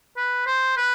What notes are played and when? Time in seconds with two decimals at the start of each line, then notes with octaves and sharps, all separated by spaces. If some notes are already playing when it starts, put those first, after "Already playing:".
0.17 B4
0.47 C5
0.77 B4